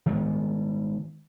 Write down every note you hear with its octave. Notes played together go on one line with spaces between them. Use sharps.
D#3 G#3 B3